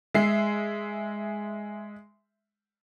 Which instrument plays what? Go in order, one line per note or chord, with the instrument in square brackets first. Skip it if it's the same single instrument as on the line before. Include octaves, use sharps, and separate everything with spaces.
[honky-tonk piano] G#3 E5 C7